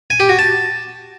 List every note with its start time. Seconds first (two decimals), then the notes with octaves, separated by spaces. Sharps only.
0.10 G#5
0.20 G4
0.29 F#4
0.39 A5